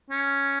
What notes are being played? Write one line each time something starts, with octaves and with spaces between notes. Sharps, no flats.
C#4